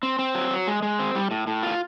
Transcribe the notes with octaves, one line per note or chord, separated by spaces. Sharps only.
C4
C4
F#3
F#3
G#3
G#3
C4
G3
A2
A2
F4